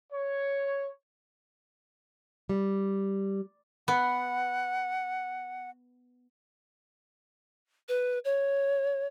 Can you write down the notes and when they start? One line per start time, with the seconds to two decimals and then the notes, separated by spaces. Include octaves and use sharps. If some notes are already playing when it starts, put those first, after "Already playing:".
0.13 C#5
2.49 G3
3.88 B3 F#5
7.89 B4
8.25 C#5